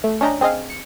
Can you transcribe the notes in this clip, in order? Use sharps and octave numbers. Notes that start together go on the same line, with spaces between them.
A3
C#4 D4 D#5 G5 A#5
C4 G#4 C5 D#5 F5
C#7